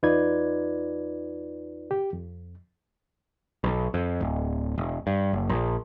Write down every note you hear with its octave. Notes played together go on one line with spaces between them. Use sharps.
E2 D#4 F4 B4 D5 G#6
G4
F2
B1
F2
D1
E1
G2
F#1
A#1